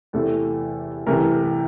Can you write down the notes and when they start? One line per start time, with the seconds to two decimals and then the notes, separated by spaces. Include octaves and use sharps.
0.13 E2 C3 E3 A3 A4
1.07 C2 C3 E3 A3 A#4